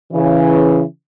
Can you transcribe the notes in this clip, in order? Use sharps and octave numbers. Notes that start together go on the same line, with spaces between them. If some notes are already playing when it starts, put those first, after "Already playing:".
C#3 E3